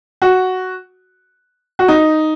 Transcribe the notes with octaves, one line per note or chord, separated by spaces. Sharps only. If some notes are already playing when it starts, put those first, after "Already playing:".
F#4
F#4
D#4